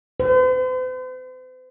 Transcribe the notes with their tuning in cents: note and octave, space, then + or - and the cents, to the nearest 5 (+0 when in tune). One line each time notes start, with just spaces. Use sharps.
C5 -45